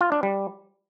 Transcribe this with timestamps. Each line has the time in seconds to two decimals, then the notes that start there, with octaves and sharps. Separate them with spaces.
0.01 F4
0.12 D4
0.23 G3